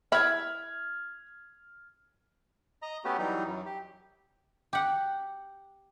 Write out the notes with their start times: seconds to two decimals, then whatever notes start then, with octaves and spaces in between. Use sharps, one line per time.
0.12 E4 F6 G#6
2.82 D#5 A#5
3.04 A3 B3 C#4 F#4 G4
3.18 E3 F#3 G3 D#4
3.47 F#2 F#3
3.65 G4
4.73 G4 F#5